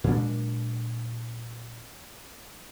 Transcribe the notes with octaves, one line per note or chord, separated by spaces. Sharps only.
A#2 F#3 G#3 D4